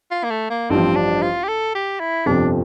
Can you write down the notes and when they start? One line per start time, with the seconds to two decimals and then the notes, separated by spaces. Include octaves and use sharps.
0.11 F4
0.24 A#3
0.30 A3
0.50 A#3
0.70 A1 G2 F3 C4
0.96 D4
1.22 F4
1.44 G4
1.48 A4
1.75 G4
2.00 E4
2.26 G1 F2 C3 F3 D4